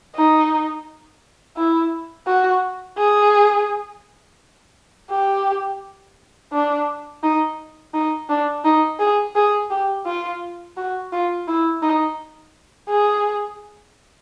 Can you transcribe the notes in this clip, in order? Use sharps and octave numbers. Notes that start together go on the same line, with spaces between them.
D#4
E4
F#4
G#4
G4
D4
D#4
D#4
D4
D#4
G#4
G#4
G4
F4
F#4
F4
E4
D#4
G#4